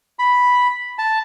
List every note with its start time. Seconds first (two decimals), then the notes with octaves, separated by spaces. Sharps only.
0.19 B5
0.98 A5